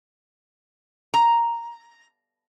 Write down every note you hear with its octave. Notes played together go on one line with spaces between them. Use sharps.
A#5